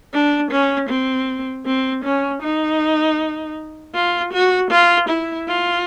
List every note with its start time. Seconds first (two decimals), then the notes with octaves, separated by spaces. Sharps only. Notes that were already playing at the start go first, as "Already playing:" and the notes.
0.13 D4
0.51 C#4
0.89 C4
1.66 C4
2.04 C#4
2.42 D#4
3.94 F4
4.33 F#4
4.71 F4
5.09 E4
5.48 F4